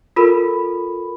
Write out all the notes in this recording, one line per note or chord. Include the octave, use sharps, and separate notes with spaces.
F4 A4 A#4 B5